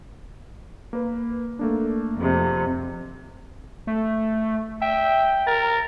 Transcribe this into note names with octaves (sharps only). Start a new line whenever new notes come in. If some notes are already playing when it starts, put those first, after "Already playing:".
A#3 A#4 B4
A3 A#3 D4
F2 C3
A3
E5 G5
A#4 A6